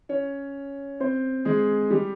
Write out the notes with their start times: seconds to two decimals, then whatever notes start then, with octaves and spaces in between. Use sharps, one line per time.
0.09 C#4 C#5
1.00 C4 C5
1.45 G#3 G#4
1.90 G3 G4